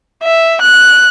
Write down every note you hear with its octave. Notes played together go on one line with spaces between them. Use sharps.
E5
F#6